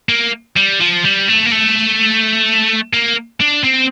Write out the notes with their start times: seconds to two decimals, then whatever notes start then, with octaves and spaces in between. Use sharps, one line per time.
0.09 A#3
0.57 G3
0.80 F3
1.04 G3
1.28 A3
1.45 A#3
1.52 A3
2.93 A#3
3.41 D4
3.64 C4